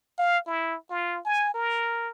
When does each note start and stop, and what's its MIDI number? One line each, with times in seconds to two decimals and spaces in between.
0.19 0.38 77
0.47 0.76 64
0.90 1.19 65
1.25 1.54 80
1.54 2.10 70